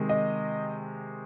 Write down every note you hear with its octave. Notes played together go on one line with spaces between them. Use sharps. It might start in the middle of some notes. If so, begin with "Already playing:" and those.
Already playing: C3 D#3 G#3
D#5